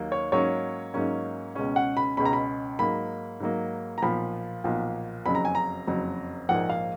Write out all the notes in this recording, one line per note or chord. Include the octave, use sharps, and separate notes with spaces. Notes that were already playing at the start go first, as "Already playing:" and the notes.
Already playing: D#2 D#3 F#3 A#3
C#5
G#2 F#3 A#3 C#4 C#5
G#2 F#3 A#3 C#4
C#2 B2 G#3 C#4
F#5
B5
C#2 B2 G#3 C#4 B5
A#5
B5
G#2 F#3 A#3 B5
G#2 F#3 A#3
A#5
B1 A#2 F3 B5
B1 A#2 F3
F#1 F2 C#3 F#3 B5
A#5
G#5
A#5
F#1 F2 C#3 F#3
A#1 G#2 F3 A#3 F#5
F5